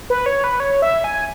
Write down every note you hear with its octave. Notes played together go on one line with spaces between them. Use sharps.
B4
C#5
B4
C#5
E5
G#5